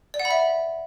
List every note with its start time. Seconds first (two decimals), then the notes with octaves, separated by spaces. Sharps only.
0.14 D5
0.20 F#5
0.25 B5
0.31 E5